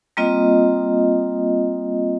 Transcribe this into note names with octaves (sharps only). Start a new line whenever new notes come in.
G3 A#3 C4 F4 D#5